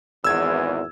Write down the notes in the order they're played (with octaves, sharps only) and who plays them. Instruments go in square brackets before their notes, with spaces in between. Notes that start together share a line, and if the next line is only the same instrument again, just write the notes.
[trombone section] G#1 E2 [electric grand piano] E6 G#6